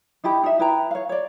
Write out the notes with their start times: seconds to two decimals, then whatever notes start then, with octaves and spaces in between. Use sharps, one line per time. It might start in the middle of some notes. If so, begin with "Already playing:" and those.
0.24 D#4 E4 G4 B5
0.44 D#4 E5
0.59 E4 B4 G5 A#5
0.91 C#5 F5
1.09 C#5 D5